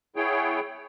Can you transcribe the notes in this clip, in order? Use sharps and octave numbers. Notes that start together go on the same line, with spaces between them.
B3 E4 G#4 C#5 G5